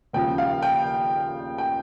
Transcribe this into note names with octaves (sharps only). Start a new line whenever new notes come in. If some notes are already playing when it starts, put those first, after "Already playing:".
D#2 C#3 F3 G5
F5
G5
G5